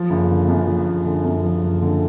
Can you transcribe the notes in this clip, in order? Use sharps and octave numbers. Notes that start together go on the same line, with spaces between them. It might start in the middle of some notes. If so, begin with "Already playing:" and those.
Already playing: F3
F#1
D3
F#2
F3
F#1
D3
F#2
F3
F#1
D3